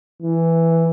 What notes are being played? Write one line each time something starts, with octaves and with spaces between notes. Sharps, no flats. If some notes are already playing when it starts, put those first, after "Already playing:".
E3